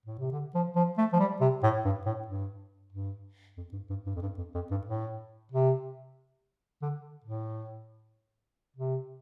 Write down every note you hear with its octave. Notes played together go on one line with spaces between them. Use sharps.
A2
C3
D3
F3
F3
A3
F3
G3
C3
A2
G2
A2
G2
G2
F2
G2
G2
G2
F2
G2
F2
F2
G2
A2
C3
D3
A2
C3